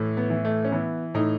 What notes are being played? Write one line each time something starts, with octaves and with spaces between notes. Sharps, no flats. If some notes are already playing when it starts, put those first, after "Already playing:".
Already playing: A2 E3
B3
E3
A3
C#4
E3 B3
A2 D#4